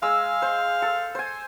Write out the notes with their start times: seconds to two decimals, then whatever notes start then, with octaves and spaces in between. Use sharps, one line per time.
0.02 G#3 F5 E6
0.42 C5
0.82 A4
1.15 C5 G#5